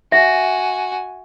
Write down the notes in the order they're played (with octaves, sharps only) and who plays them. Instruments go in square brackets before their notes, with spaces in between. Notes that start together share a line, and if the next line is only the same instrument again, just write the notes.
[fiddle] F#4 G#5 [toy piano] E5